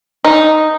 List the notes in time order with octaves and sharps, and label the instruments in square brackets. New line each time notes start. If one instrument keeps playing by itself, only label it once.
[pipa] D#4